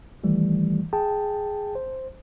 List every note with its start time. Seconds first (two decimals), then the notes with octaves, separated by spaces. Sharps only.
0.24 D#3 E3 G3 A3
0.93 G#4 G5 A5
1.75 C5